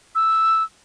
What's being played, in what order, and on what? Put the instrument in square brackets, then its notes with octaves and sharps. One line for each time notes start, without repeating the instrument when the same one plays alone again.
[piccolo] E6